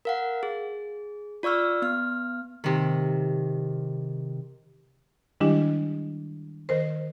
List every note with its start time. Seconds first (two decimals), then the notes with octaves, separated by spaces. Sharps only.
0.05 A#4 F5 F#5
0.43 G#4
1.43 F4 D5 C#6 E6 F6
1.82 B3 F6
2.64 C3 D#3
5.40 D#3 G3 G#3 D4 E4 G4
6.69 D#3 A#4 C5